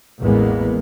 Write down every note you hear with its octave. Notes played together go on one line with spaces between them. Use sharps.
A1 E2 G#3 A#3 B3